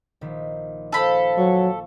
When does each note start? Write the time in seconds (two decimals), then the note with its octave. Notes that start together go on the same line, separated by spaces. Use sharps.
0.21 A#1 D#3 B6
0.92 F4 A4 C5 F5 B5
1.38 F#3 C#6